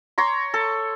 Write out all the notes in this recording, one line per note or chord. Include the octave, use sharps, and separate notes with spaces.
C#5 A#5 C6
A4